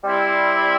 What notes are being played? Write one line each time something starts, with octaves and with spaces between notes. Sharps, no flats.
G3 C4 E4